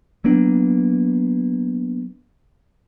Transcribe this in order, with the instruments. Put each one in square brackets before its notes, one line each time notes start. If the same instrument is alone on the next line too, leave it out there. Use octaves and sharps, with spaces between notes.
[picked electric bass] F#3 A#3 B3 D4